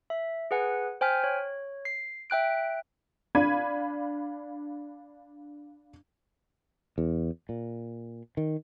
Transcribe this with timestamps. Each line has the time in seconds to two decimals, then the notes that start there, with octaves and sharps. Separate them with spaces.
0.10 E5
0.51 G#4 B4 F#5 G#5
1.01 C5 G5 G#5 F6 B6
1.24 C#5
1.85 C7
2.30 E5 G5 F#6 D7
3.35 D4 F5 B5 G#6 D#7
6.98 E2
7.49 A#2
8.37 D#3